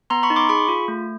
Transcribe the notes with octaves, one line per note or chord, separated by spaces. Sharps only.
B3 A#5 C6
B5 C#6
D#4
C6 D6
G#4 B5 C#6
F4
A3